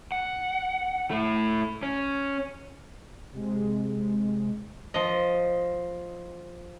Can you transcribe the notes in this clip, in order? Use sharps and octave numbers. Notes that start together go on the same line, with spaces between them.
F#5
A3 E4
C#4
C3 G#3
F3 D#5